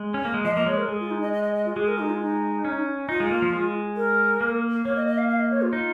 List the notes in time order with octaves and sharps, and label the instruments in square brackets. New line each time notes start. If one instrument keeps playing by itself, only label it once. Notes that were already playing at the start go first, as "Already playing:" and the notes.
Already playing: [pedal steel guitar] G#3
C#4
A#3
G#3
[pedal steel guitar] F3 [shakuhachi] D#5
[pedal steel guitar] A#3 [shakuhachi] D#5
[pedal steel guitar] G#3 [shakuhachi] C#5
[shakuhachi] A#4
[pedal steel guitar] G#3 [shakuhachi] G#4
[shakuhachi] F4
D#4
D#5
D#5
D#5
D#5
F4
[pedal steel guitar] G#3 [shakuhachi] G#4
[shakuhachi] A#4
D#4
F4
D#4
[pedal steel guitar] C#4
[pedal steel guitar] D#4 [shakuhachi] F4
[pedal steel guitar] G#3
A#3
F3
G#3
[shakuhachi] A#4
[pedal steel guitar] A#3
[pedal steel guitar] A#3 [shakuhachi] C#5
[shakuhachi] D#5
D#5
F5
F5
D#5
C#5
F4
[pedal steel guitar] D#4 [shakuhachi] F4